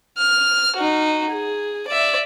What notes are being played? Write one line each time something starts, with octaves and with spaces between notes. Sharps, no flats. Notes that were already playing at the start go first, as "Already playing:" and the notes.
F6
D#4 F#4
G#4
D5 E5